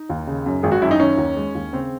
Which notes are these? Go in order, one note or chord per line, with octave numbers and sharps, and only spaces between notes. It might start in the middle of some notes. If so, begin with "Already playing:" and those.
Already playing: D#4
D#2
C#3
F#2
G#1 G#4
F#4
F#2 E4
D#4
D#3 C#4
D#2
G#3
D#2
C#3 C4